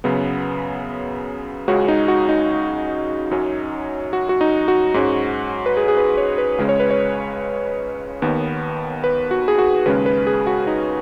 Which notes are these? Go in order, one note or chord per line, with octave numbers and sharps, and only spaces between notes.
F#2 C#3 B3
C#2 C#3 G#3 C#4 F#4
D#4
F#4
D#4
F#2 F#3 C#4
F#4
F#4
D#4
F#4
G#2 G#3 C#4
B4
G#4
G#4
B4
C#5
B4
C#2 C#3 G#3 C#4
C#5
B4
C#5
D#2 D#3 B3
B4
F#4
G#4
F#4
D#2 C#3 G#3 C#4 B4
B4
G#4
F#4
D#4